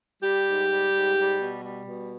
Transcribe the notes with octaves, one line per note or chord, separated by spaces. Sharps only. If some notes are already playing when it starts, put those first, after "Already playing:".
G3 G4
G#2
G3
G#2
G3
B2
G3
B2